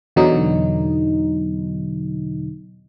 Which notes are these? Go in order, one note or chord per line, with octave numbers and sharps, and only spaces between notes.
E2 B2 D3 F#3 D#4